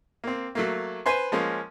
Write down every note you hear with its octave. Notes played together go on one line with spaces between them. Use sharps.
A#3 C4
F#3 A3 A#3
B4 C5 G#5 C6
F3 G#3 A#3 C#4